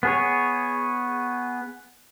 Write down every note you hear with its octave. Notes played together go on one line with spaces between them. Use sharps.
B3 G#4 C#5